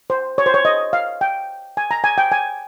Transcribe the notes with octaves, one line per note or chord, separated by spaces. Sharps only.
C5
C#5
C5
C#5
D#5
F5
G5
G#5
A#5
G#5
G5
G#5